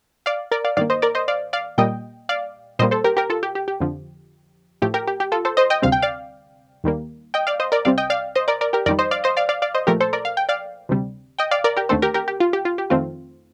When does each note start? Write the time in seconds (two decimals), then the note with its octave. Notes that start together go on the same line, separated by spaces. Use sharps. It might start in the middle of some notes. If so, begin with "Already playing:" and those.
0.26 D5 F5
0.51 A#4 D5
0.65 D5 F5
0.77 G2 D#3 A#3 D5 F5
0.90 C5 D#5
1.02 A#4 D5
1.15 C5 D#5
1.28 D5 F5
1.53 D5 F5
1.78 A#2 G3 A#3 D#5 G5
2.29 D5 F5
2.79 A#2 G3 A#3 C5 D#5
2.91 A4 C5
3.04 G4 A#4
3.17 G4 A#4
3.30 F4 A4
3.43 G4
3.55 G4
3.68 G4
3.80 F2 D3 F3
4.82 A2 F3 A3 G4
4.94 G4 A#4
5.07 G4
5.20 G4
5.32 F4 A4
5.45 A4 C5
5.57 C5 D#5
5.70 D#5 G5
5.82 D2 C3 G3 C4 F5
5.92 G5
6.02 D5 F5
6.84 D#2 D#3 G3 A#3
7.34 D#5 G5
7.47 D5 F5
7.60 C5 D#5
7.72 A#4 D5
7.85 C2 C3 G3 C4 D5 F5
7.98 D#5 G5
8.10 D5 F5
8.35 C5 D#5
8.48 A#4 D5
8.61 A#4 D5
8.73 G4 A#4
8.86 F2 D#3 G3 A#4 D5
8.99 C5 D#5
9.11 D5 F5
9.24 C5 D#5
9.37 D5 F5
9.49 D5 F5
9.62 D5 F5
9.74 C5 D#5
9.87 A#2 F3 A3 G4 A#4
10.00 A4 C5
10.13 A#4 D5
10.25 F5
10.37 G5
10.49 D5 F5
10.89 D2 C3 G3
11.38 D#5 G5
11.51 D5 F5
11.64 A#4 D5
11.77 G4 A#4
11.89 D#2 D3 A3 C4 A4 C5
12.02 G4 A#4
12.14 G4 A#4
12.28 G4
12.40 F4
12.53 G4
12.65 F4
12.78 G4
12.90 F2 D#3 A3 C4 F4